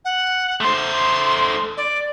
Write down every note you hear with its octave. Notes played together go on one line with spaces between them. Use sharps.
F#5
A3 C5 C6
D5